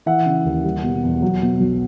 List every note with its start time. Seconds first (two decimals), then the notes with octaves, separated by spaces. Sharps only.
0.06 E3 E5 F#5
0.26 C#3
0.45 D#2
0.64 G3
0.83 B2
1.04 E2
1.22 F#3
1.42 B2
1.60 B1